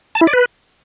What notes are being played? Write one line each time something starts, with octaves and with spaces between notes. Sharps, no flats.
A5
E4
D5
B4